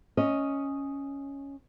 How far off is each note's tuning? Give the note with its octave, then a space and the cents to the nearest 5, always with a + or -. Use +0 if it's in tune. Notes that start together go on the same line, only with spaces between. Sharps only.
C#4 +0 D#5 +0